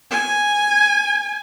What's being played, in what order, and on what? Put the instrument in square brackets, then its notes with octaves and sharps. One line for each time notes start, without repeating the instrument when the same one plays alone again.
[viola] G#5